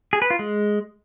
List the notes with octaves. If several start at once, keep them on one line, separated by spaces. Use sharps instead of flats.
G#4
B4
F4
G#3